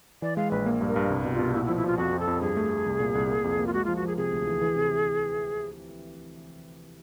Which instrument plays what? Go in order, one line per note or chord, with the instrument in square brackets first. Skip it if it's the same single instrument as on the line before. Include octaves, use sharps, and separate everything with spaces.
[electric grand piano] E3 [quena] D5
[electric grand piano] G#3 [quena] F5
[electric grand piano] A#1 [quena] B4
[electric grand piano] A#3
G2
[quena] A#4
[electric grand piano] G2
C2
B2
[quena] F4
[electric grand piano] B2
[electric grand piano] A#2 [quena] E4
[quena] E4
[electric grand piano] F3
[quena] E4
[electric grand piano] F3 [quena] F4
[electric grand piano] F2 [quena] F#4
[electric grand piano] F2
[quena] A4
[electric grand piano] F2
[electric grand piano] G2 [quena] G#4
[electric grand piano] A3
A3
C2
A#2
C2
A#3
F2
A#3
[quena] F4
[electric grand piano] G#3 [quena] F#4
[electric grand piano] F3 [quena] F4
[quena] F#4
[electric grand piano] F3 [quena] G#4
[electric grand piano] C3 [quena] G#4
[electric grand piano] D2
E3
E3
C3
E3